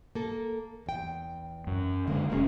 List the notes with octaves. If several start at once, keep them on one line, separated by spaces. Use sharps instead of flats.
A#3 A4
E2 G5
F#2
D3 G#3 A#3
F1 B2 A#3 C#4 F#4 G#4